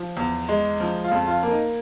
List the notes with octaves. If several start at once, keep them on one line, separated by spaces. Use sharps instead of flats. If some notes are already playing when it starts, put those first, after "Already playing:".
Already playing: F3
E2
G#3
F3
F4
F2
F4
A#3
D#4